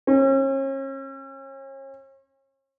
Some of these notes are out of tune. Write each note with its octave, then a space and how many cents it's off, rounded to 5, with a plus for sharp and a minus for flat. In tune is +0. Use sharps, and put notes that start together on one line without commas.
C#4 -40